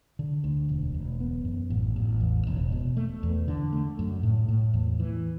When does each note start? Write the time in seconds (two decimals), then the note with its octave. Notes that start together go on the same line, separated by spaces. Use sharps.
0.19 D3
0.44 D2
0.69 E1
0.94 E1
1.20 B3
1.45 F#2
1.70 A1
1.96 A1
2.21 E2
2.47 E1
2.72 B2
2.97 A3
3.23 E2
3.48 D3
3.73 A3
3.99 F#2
4.23 A2
4.48 A2
4.74 E2
5.00 E3